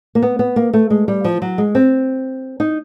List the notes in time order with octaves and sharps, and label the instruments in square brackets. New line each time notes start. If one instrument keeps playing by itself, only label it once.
[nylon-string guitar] A#3
B3
B3
A#3
A3
G#3
G3
F3
F#3
G#3
C4
D#4